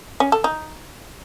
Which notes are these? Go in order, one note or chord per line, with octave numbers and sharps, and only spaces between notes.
C#4
A4
D#4